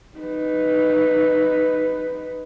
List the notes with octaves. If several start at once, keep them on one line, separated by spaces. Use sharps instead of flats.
D#4 B4